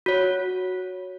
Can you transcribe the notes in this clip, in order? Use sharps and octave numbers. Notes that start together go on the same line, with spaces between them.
F#4 C#5